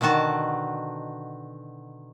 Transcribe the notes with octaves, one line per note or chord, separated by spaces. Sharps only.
B2 D3 D#3 F#4 A5